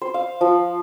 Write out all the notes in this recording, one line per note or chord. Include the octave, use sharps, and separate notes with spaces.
C5
F5
F3